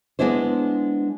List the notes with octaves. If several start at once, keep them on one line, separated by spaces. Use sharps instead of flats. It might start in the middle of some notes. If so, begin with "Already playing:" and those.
G#3 B3 D4 E4 C5